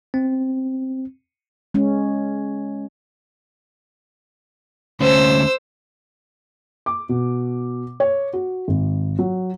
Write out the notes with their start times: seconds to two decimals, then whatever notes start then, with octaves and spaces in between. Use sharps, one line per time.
0.14 C4
1.74 G#3 C#4
5.00 D2 C#4 C5 E6
6.86 D6
7.09 B2
8.00 C#5
8.33 F#4
8.68 G#1
9.19 F#3